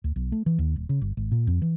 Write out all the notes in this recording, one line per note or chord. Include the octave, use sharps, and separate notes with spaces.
D2
B1
A3
E3
D#2
D#1
C#3
G1
G#1
A#2
F2
E3